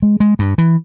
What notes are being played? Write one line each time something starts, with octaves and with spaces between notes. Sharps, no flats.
G#3
G#3
G2
E3